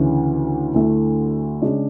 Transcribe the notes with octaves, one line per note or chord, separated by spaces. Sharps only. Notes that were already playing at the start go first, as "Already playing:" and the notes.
Already playing: D2 C#3 E3
D2 D3 A3 E4
C#3 G#3 D4